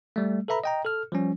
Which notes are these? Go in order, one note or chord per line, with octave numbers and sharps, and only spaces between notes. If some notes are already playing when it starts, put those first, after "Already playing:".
G3 A3
A4 B4 E5 A#5 B5
D#5 G5 A#5
A4 F6
F3 G3 C#4